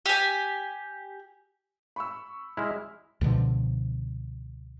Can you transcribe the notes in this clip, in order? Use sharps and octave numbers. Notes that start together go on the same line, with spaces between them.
G4 G#5
B5 C#6 E6
G#3 E4 F6
C#2 B2 D3 F3